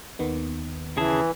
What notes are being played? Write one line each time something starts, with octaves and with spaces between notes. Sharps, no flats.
D#2 D#3 B3
C#3 E3 G#4 A5